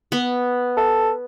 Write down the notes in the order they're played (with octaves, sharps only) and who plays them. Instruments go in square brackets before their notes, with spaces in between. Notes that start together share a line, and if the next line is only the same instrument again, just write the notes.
[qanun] B3
[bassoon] A4